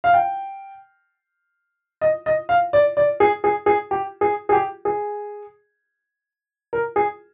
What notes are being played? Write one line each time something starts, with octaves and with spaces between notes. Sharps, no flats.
F5
G5
D#5
D#5
F5
D5
D5
G#4
G#4
G#4
G4
G#4
G#4
G4
G#4
A#4
G#4